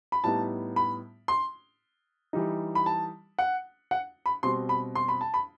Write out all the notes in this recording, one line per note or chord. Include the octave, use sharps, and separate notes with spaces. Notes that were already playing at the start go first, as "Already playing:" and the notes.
B5
A2 G3 B3 D#4 A5
B5
C6
E3 G3 D#4
B5
A5
F#5
F#5
B5
B2 G3 C4 C6
B5
C6
B5
A5
B5